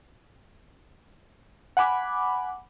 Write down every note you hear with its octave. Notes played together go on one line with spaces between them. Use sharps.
F#5 G#5 B5 D6